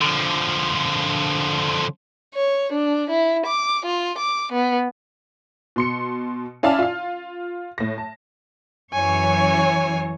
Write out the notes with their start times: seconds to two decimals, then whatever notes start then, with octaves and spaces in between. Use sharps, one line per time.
0.01 D3 F3
2.34 C#5
2.73 D4
3.10 E4
3.46 D6
3.86 F4
4.18 D6
4.52 B3
5.76 B2 C6 C#7
6.63 C#4 E4 D5 E5 F5 A5
6.79 F4 F5
7.78 A2 A#6
7.98 A5
8.94 F#2 E3 C#5 G#5